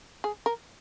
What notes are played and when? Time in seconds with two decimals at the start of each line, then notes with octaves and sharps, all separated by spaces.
0.24 G#4
0.46 A#4